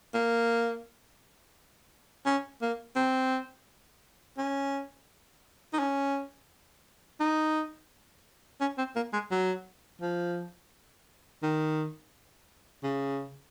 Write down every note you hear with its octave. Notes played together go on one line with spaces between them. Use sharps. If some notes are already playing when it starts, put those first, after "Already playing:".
A#3
C#4
A#3
C4
C#4
D#4
C#4
D#4
C#4
C4
A#3
G#3
F#3
F3
D#3
C#3